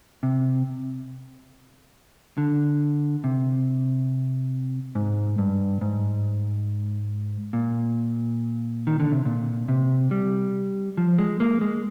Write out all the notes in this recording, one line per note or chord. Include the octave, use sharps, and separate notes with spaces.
C3
D3
C3
G#2
G2
G#2
A#2
D#3
D3
C3
A#2
C3
G3
F3
G#3
A#3
G#3